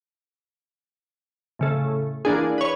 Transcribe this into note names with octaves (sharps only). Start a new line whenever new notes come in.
A2 C#3 A3
E3 A#3 D4 G#4
B4 C#5